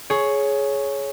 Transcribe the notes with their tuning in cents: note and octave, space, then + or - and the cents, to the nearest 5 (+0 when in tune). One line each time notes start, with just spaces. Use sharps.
G#4 +15 C#5 +0